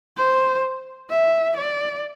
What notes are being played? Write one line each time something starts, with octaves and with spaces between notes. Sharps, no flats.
C5
E5
D5